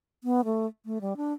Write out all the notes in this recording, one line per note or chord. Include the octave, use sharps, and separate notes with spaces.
B3
A3
A3
G3
D4